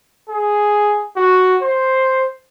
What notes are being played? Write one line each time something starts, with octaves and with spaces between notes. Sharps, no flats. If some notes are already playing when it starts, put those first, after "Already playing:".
G#4
F#4
C5